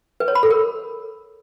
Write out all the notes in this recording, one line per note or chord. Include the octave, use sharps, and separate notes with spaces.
B4
C#5
B5
A4
A#4